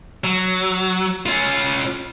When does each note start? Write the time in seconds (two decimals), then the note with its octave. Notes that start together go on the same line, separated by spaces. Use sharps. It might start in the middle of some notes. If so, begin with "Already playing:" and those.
0.24 F#3
1.26 C#4 F4